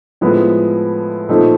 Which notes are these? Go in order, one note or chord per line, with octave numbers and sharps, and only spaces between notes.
A2 F3 G#3 B3 E4
A#2 F3 A3 C4 D#4